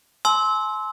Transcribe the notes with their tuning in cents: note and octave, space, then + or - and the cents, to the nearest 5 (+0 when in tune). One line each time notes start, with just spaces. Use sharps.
G#5 +40 C6 +5 E6 -25